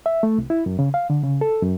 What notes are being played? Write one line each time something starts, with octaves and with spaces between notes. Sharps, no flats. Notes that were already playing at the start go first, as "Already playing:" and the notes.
E5
A3
C2
E4
F#2
C#3
F5
D3
C#3
A4
F#2